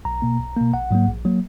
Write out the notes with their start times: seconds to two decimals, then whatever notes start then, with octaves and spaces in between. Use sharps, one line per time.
0.05 B1 A#5
0.22 B2 A#3
0.39 B1
0.56 B2 A#3
0.73 A#1 F#5
0.91 G#2 F#3 A#3
1.08 A#1
1.25 F#3 A#3